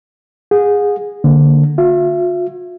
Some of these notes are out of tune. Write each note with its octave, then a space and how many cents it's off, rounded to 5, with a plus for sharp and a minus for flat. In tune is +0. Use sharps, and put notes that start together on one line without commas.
G#4 -15 F#5 -40
D3 +0 A#3 -15
F4 +45 E5 +30